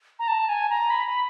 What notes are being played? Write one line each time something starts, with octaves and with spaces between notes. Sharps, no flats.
A#5
A5
G#5
A#5
B5
B5